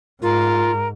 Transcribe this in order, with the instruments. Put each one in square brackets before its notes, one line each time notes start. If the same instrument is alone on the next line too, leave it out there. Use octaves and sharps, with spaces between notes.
[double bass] G#2 [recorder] F4 [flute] A#4